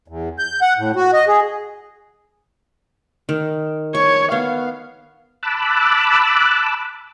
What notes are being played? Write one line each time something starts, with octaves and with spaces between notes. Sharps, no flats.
E2
G6
F#5
A2
F#4
D#5
G#4
D#3
C#5 C#6
B3 F5
A5 B5 D6 E6 F#6